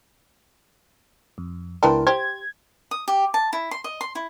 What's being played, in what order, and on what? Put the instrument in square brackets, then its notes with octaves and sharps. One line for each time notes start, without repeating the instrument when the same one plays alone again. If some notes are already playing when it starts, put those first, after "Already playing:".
[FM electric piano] F2
[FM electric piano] C#2 E4 A#4 [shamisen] B3 C4 D4
[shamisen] G4 C5 [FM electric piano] G#6
[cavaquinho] D#6
G4
A5
E4
C6
D#5
C6
E4